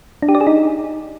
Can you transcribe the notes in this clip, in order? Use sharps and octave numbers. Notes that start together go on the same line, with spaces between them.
D4
G4
D5
G#4
D#4